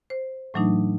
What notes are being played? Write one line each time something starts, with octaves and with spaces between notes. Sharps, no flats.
C5
A2 E3 F#3 A3 D4 D#4